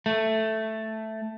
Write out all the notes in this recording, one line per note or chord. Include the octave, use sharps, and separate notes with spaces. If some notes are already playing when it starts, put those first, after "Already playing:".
A3